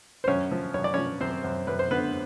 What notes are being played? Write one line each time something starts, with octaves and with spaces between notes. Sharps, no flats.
C5
F#2 C#4 C#5
F3
F#2 C#5
D5
F3 C#4 C#5
F#2 C4 C5
F#2
F#2 B4
C5
D3 B3 B4